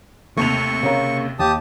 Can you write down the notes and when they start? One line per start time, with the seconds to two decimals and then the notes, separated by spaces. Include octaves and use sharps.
0.37 D#2 C3 A3 C#6 F7
0.83 C#3 A#3
1.39 D#2 G4 A5 D#6